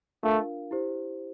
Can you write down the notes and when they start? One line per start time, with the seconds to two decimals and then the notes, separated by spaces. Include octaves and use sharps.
0.23 A3 D4 F4 A#4 F5
0.71 E4 G4 C5